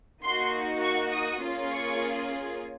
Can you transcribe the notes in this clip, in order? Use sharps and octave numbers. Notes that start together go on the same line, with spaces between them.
A#3 D#4 F#4 C6
C#6
D#6
A#3 C#4 F4 G#4
C#6